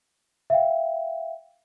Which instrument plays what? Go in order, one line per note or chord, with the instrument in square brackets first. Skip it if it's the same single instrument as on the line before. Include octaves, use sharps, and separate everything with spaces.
[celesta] E5 F5 G5